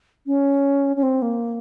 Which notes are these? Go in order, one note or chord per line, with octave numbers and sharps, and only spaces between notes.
C#4
C#4
C4
A#3